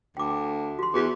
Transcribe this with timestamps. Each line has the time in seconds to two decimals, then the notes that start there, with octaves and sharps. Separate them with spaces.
0.17 D2 G5 D6
0.79 F#4 C6
0.94 E2 F#4 G#4